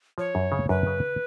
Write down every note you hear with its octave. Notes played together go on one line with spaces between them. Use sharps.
F3 C#5
F#2
C#3
F#2 B4
C#3